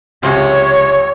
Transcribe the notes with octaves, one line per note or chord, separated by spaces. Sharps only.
C#2 C3 C#5